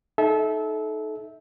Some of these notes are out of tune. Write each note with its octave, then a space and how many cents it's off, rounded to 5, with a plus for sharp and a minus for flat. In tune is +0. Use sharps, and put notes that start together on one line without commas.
D#4 +0 A4 -30 E5 -20